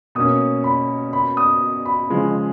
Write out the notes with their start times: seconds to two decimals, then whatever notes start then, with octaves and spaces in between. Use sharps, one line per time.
0.15 B2 A#3 C#4 D#6
0.64 B5
1.13 B5
1.37 D#6
1.86 B5
2.10 C#3 F3 G#3